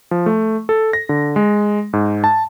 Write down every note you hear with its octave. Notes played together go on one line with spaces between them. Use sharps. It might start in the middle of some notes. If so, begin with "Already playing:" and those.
F3
A3
A4
A#6
D3
G#3
G#2
A5